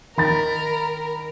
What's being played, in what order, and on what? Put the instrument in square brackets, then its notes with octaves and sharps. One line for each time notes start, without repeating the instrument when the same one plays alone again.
[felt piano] D#3 B5 A6 [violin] A#4